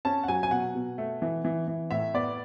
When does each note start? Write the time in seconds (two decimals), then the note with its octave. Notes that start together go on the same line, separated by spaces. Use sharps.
0.05 C#4 A5
0.24 F#5
0.28 F#3 G#5
0.43 G#5
0.51 B2 F#5
0.75 B2
0.98 A3
1.22 E3
1.45 E3
1.68 E3
1.91 A2 E5
2.14 B3 D5